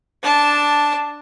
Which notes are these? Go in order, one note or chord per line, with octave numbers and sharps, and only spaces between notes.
D4 A5